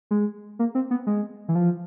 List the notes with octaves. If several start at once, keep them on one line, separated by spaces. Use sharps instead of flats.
G#3
A#3
C4
B3
G#3
E3
F3